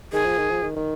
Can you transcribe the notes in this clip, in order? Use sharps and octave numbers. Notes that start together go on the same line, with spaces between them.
D#3 G#4
F3
D#3
F3
D#3
D#3